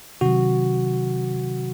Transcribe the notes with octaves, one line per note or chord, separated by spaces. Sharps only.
C3 D#3 F#3 F#4